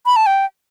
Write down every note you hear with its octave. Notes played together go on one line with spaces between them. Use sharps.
B5
A5
G5